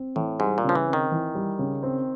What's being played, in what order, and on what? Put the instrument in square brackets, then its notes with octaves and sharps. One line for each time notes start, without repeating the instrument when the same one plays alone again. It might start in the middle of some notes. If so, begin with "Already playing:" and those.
Already playing: [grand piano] C4
[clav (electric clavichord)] A2 [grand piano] E3
[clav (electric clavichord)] G#2 [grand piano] G3
[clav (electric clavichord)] A#2
[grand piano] C#3
[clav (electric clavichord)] F3
E3
[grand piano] C4
[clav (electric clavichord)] D#3
[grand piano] E3
G3
C#3
C4